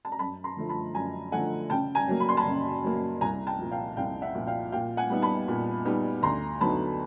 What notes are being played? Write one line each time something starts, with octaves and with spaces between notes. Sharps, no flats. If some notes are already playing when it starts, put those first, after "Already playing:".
A5
A#5
F#2 A5 B5
A#5 C6
D3 F3 A3
A5 B5
F#2 G#5 A#5
D3 F3 A3 F#5 G#5
C#3 G5 A5
G#5 A#5
F#3 A#3
B5
C6
A5 B5
C#3
F#3 A#3
C2 G#5 A#5
G5 A5
A#2 F3
F5 G5
C2 F5 G5
E5 F#5
A#2 F3
F5 G5
A#2 F5 G5
F#5 G#5
G3 B3 D#4
A5 B5
A#2
G3 B3 D#4
D2 A#5 C6
D3 F#3 B3 D#4 A5 B5